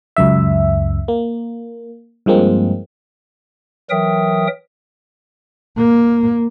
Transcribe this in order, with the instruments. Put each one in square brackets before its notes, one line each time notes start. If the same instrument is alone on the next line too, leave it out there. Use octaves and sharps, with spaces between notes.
[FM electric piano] C#2 F#2 E5
A#3
G2 F3 G#3 A#3 C4
[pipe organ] E3 F#3 A#4 E5 G5 D#6
[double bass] A#3